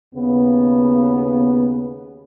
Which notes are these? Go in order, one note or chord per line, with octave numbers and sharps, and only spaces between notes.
D#2 C#3 B3